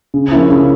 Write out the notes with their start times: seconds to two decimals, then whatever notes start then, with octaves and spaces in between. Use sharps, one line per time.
0.14 C#3
0.31 F3 A#3 C#4 E4
0.50 C#3